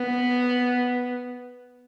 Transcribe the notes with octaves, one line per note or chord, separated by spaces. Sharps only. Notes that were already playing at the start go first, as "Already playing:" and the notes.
Already playing: B3